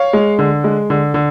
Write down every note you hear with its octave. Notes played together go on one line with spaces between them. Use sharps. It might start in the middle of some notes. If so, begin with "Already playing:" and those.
Already playing: C#5 F5
G#3
D3
G#3
D3
D3